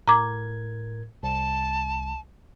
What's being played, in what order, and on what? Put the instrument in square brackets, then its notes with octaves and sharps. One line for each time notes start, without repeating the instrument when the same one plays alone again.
[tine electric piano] A2 A#4 G#6 [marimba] A#5 D6
[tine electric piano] C2 [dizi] A5